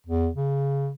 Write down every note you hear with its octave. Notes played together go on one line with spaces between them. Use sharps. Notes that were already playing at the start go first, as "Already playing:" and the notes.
E2
C#3